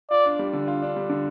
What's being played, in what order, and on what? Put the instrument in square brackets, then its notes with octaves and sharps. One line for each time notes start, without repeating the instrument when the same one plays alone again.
[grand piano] F4 [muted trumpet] D5
[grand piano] D4
G3
D3
F4
D4
G3
D3